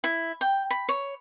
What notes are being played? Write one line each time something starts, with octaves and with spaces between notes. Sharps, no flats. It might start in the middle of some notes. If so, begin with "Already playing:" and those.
E4
G5
B5
C#5